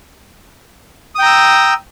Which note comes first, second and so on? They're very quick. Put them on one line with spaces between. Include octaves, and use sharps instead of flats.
D#6 G5 A#5 E6